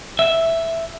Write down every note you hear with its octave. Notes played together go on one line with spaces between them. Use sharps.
E5